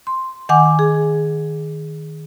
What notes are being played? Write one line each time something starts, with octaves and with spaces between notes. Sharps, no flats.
C6
D#3 F#5 G#5 D6
G#4